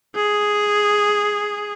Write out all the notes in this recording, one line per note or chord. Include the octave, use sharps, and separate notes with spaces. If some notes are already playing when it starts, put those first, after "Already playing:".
G#4